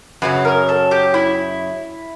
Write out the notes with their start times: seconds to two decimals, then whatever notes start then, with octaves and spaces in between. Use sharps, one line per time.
0.22 F#2 C#3 F#3 B4
0.45 A#4
0.69 A4
0.91 G4
1.14 E4